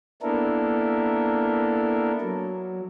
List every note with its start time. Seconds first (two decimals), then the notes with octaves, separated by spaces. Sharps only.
0.22 A#3 B3 D4 E4 A4 A#4
2.21 F#3